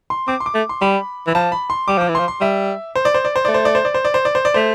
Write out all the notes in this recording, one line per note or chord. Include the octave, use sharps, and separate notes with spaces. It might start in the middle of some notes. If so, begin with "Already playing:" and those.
C6
C4 D6
C6
D6
A3
C6
G3 B5
E3
B5
F3 A5
B5
C6
G3 D6
F3 D6
E3
F3 C6
C6
G3 E5
C5
D5
C5
D5
C5
A3 D5
C5
D5
C5
D5
C5
D5
C5
D5
C5
D5
A3 C5